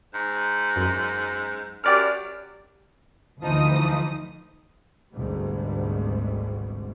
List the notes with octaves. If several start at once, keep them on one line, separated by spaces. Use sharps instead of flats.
G#2
F#2
F#2 G4 D5 F6
D2 E3 F3 D#4 D#6
G#1 D2 G#2 B2 G3 G#3